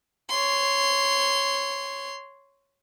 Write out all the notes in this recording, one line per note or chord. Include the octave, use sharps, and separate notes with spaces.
C#5 C6